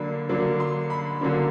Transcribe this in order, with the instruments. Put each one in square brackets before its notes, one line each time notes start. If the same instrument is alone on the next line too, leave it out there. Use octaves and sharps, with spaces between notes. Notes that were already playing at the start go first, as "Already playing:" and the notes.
Already playing: [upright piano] D3 F#3 A#3 D4 B5
D3 F#3 A#3 D4
C6
B5
D3 F#3 A#3 D4